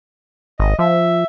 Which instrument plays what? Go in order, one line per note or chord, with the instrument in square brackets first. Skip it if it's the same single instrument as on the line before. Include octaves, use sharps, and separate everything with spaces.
[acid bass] G#1 [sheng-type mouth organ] D#5
[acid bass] F3 [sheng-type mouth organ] E5